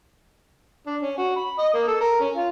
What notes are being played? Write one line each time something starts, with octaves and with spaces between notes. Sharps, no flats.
D4
C#4
F#4
B5
D#5
A#3
A4
A#4
C#4
F4